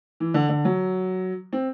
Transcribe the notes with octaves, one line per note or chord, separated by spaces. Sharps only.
E3
D3
D3
F#3
C4